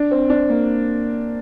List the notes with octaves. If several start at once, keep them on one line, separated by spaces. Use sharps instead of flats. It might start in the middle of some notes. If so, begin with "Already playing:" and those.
Already playing: D4
C4
D4
A#3